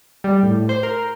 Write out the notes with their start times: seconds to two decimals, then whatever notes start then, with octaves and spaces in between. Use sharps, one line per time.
0.24 G3
0.43 A2
0.69 C5
0.83 A#4